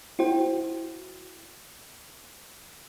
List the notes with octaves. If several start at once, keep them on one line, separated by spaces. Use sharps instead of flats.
E4 F#4 C5 G5